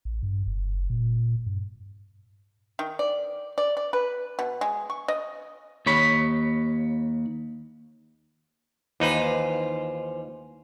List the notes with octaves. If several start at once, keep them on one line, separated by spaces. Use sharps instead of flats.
A1
G2
F#1
A#2
G2
D#3
D5
D5
D5
B4
B2
G#3
C#6
D#5
D#2 C#5 B5
D#2 E3 D#4 F4 B4 C5